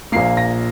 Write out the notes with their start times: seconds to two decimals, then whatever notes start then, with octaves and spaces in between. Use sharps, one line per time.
0.12 A#1 A#2 A#3 C7
0.37 A#6